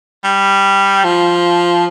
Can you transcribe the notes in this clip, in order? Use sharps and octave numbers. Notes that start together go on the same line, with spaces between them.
G3
F3